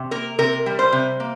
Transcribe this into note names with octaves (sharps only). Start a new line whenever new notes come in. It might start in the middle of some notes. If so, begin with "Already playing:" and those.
Already playing: C3
A#3 A#4
C3 A#4
G3
C5
C3
A#3